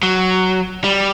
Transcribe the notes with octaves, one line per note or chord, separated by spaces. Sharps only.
F#3
G3